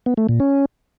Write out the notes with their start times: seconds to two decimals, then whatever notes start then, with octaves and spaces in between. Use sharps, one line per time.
0.06 B3
0.17 A3
0.29 A#2
0.40 C#4